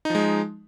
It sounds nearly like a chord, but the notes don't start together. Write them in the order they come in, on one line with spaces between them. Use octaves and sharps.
D#4 F3 G#3